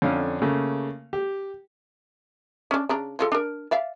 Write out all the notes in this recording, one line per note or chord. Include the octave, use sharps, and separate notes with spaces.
F2 D3 C#4 D4 F5
C#3 A3 A#3
G4
C#4 D4
C#3 D4 A#5
F3 F4 A4
D4 A#4
D5 E5 F5